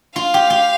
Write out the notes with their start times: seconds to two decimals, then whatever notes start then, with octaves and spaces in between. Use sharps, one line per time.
0.16 F4 F5
0.34 G4
0.50 G4